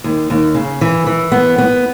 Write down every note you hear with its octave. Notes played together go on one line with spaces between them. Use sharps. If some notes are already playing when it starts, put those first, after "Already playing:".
D#2
D#2
C#3
E3
E3
B3
B3